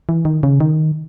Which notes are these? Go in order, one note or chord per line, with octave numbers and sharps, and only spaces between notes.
E3
D#3
C#3
D#3